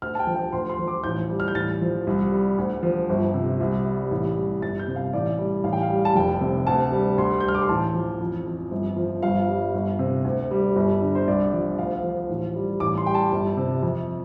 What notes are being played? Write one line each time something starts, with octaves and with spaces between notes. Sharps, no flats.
D2 F6
A5
G5
F3
G5
D2 C6
C6
F3
D6
A1 G6
G3
F6
G6
A1 A6
F3
C2
G3
D2
F3
G1
C3
C2
G3
A1
G3
G1 A6
G6
C3
F5
A1 D5
G3
A1 F5
G5
F5
G3
A5
F1 G5
C3
D2 A5
G3
D2 C6
G6
G3 F6
D6
C6
A1 A5
F3
F2
F2
G1
F3
G1 F5
G3
G1
C3
D2
G3
G1
D3
C5
C2 D5
F3
D2 F5
F3
A1
G3
A1 D6
C6
G3 G5
A5
G1
C3
F2